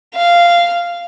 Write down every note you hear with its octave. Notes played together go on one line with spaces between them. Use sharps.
F5